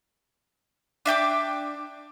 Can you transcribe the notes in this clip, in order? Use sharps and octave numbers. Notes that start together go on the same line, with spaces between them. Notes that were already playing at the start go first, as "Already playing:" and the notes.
D4 E5 G5 D6